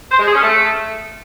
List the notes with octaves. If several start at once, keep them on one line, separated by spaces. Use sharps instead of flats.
C5
G#3
G#4
C#4
A3